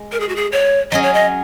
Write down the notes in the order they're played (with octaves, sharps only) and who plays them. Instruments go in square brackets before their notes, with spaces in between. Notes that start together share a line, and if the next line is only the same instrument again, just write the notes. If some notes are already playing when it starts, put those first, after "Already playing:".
Already playing: [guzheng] G#3
[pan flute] A#4
G#4
F#4
G#4
C#5
[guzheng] F#3 C#4 G#4 [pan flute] D#5
[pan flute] C#5
D#5